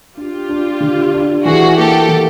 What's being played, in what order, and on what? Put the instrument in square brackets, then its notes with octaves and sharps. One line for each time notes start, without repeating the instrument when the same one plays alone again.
[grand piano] D4 [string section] F4 G4
[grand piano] D4
D3
D4
[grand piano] E3 [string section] F#4 G#4
[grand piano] A#3 [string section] G4 A4
[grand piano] E3